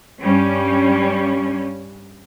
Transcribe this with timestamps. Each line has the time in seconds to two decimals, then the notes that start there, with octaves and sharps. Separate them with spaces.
0.23 G2 G3 C#4